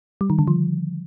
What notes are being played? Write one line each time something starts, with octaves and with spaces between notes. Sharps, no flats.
G3
D#3
D3
F3